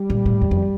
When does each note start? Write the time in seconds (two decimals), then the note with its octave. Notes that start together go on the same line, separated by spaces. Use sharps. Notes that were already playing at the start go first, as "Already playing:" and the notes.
Already playing: G3
0.10 A#2
0.26 A2
0.41 E2
0.51 F2